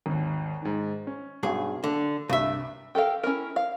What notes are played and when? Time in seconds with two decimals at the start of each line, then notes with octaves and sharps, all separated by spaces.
0.06 G#1 D#2
0.62 G#2 D#3
1.07 C#4
1.43 B1 G2 G#4
1.84 D3
2.29 C2 G2 E5
2.95 G4 A4 A#4 F5
3.23 C#4 E4 A#4
3.56 F5